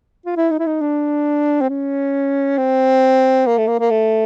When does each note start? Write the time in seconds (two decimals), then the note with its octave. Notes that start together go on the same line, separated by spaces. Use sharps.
0.26 F4
0.36 E4
0.51 D#4
0.59 E4
0.66 D#4
0.81 D4
1.61 C4
1.69 C#4
2.58 C4
3.47 A#3
3.58 A3
3.68 A#3
3.80 A#3
3.90 A3